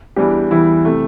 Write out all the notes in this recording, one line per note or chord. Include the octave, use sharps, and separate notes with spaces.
E2 E3 G3 D4 G4
E2 E3 G3 E4
C3 A3